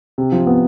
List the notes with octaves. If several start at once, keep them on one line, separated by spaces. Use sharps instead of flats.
C3
F3
B3